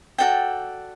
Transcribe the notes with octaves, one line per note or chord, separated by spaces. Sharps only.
F#4 A4 D5 G5